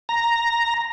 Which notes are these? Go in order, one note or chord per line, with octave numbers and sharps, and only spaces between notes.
A#5